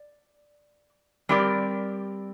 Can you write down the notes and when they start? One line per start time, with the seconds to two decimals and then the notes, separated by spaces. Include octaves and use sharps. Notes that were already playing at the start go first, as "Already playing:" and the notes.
Already playing: D5
1.29 G3 C4 G4 A#4 D5